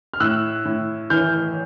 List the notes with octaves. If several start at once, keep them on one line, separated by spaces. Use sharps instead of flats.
F6
A2 E6 F#6
A2
E3 F6 G6